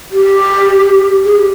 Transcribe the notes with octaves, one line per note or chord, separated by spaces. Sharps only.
G4
G#4
G4